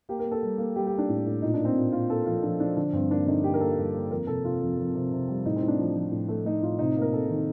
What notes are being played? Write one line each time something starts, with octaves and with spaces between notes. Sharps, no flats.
A#3 G4
A#4
A#3
A4
G3
A#3
G3 G4
G4
A#3
D4
A2
A2
A#2 D#4
D4
A#3
C4
A#2
A#2 F4
A#3 A4
F3 F4
F3 D4
F3 D4
D3 D4
G2 C4
A#3 D4
D3 D#4
A#3 G4
A#4
A#3 A4
G2
A#3
F2 A#4
C3 A4
C3 F4
F2
F2
C3
C3
G3
A2 D#4
C4
A2
D4
F3
F3
A2
A3
A3 D#4
A2 F4
C3 D#4
A#3
A#4
C3 A4
D#3